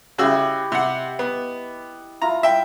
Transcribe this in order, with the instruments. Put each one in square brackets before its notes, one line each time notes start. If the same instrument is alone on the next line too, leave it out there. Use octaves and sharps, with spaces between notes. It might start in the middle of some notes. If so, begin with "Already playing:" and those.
[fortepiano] C#3 F#4 E6 [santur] E4 G4 D#5
[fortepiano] C3 F#5
B3
[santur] E4 F4 [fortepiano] A#5
[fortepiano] E5 G5